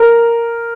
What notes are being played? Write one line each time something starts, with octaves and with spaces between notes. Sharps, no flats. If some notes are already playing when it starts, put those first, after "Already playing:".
Already playing: A#4